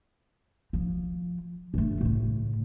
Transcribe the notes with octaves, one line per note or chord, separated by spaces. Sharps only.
F3
G2 A3
A2 C#3